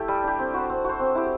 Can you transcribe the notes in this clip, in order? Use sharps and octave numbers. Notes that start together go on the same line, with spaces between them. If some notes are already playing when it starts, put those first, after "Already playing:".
Already playing: A3 E4 G4 A4
G3
D4 G4
C4
F#4 C5
C4
F#4 C5
C4
E4 G4